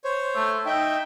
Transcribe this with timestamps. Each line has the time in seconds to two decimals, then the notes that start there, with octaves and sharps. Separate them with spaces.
0.04 C5 C#5
0.36 A3
0.66 D#4 E5 G5